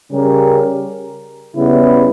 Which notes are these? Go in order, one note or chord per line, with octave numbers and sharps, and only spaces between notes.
C#3 G3 C#4 G4 A#4
C#3 G3 B3 E4